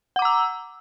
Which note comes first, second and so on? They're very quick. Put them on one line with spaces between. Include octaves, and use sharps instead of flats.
F#5 D6 A#5 E6